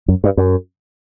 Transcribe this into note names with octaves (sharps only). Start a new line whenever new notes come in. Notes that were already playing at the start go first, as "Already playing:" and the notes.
F#2
G2
F#2